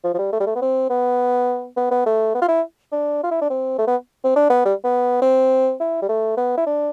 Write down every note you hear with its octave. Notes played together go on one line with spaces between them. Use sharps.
F3
F3
G3
A3
G3
A3
B3
C4
B3
B3
B3
A3
B3
F4
E4
D4
F4
E4
D4
C4
A3
B3
C4
D4
B3
G3
B3
C4
E4
G3
A3
B3
E4
D4